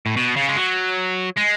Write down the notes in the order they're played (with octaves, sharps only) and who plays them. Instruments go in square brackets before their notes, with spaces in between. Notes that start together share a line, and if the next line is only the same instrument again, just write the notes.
[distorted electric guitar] A2
B2
C#3
G#3
F#3
G#3